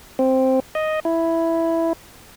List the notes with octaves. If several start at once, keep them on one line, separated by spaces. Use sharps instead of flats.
C4
D#5
E4